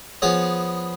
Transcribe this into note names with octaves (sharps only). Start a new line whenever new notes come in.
F3 B3 G#4 C#5